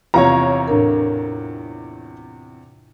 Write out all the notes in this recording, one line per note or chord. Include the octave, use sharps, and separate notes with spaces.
E2 C3 F3 C#5 F5 A#5
A2 D4 A#4